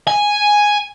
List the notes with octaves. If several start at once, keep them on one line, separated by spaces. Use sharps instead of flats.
G#5